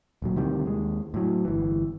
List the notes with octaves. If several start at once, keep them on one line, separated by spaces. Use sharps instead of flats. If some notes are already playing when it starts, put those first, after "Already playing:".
D#1 A#2 F#3
D2 C3 D#3 G3
D#2 G#3
A2 F#3
G1 E3